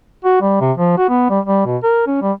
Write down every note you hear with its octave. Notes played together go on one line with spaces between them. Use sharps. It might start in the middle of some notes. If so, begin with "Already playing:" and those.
F#4
G3
C3
F3
F#4
B3
G3
G3
B2
A#4
C#4
G3